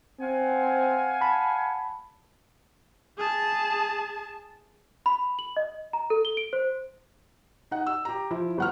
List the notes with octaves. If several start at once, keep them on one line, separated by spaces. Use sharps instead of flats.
C4 F5 F#5 G#5
A5 B5
G#4 A5
B5
F#7
D#5
A#5
A4
G7
D7
C5
D#4 F#5
E6
G4 A#5
F3 E4
G1 F#5 F6